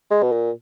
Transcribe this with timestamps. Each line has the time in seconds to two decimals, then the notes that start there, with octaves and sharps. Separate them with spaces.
0.11 G#3
0.23 B2
0.32 A#2